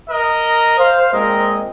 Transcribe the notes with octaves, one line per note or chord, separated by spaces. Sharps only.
A#4 D#5
C5 F5
A#2 G#3 C4 A#4 D#5